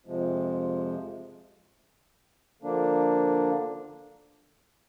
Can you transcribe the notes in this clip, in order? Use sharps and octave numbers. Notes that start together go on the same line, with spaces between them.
F2 C3 F3 G#3
D3 F3 A#3 D4